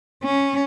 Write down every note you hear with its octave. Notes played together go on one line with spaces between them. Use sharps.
C#4